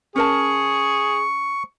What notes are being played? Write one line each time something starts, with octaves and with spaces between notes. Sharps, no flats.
C#4 G#4 A#4 A5 C#6